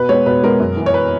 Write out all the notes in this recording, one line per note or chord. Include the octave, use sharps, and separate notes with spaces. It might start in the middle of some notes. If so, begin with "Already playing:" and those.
Already playing: B2 B4
G#3 B3 C#5
B2 B4
G#3 B3 A#4
F#2
E3 B3
C#5
B4